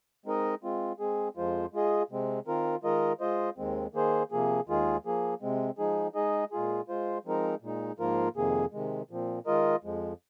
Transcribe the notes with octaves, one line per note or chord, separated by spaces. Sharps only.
G#3 C4 D#4 A#4 D#5
G#3 C4 F4
G#3 C4 G#4
F2 F3 G#3 F4 C5
G#3 F4 G#4 D#5
C3 G#3 C4
D#3 C4 F4 A#4
D#3 G#3 F4 A#4 D#5
G#3 F4 C5 D#5
D#2 D#3 G#3 C4
D#3 A#3 G#4 C5
C3 F3 A#3 G#4
D#2 D#3 G#3 F4 G#4
F3 A#3 G#4
C3 G#3 C4
F3 G#3 D#4 G#4
G#3 D#4 G#4 D#5
A#2 G#3 F4 G#4
G#3 F4 C5
F3 G#3 C4 D#4 A#4
A#2 G#3 D#4
G#2 F3 A#3 F4 A#4
F2 C3 D#3 A#3 G#4
C3 D#3 G#3
A#2 F3 C4
D#3 G#3 F4 A#4 D#5
F2 F3 G#3